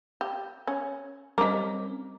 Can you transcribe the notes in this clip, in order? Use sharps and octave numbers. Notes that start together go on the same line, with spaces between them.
G4
C#4
G3 C4 C#4 D#4 A#4 D#5 D6